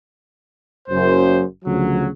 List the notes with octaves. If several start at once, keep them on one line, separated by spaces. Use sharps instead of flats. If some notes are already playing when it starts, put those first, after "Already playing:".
F#1 F#2 C5
D2 C#3 F3 F#3